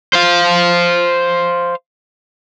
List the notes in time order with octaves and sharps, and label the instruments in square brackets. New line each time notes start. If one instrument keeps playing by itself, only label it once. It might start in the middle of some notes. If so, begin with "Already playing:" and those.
[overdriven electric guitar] C5 F5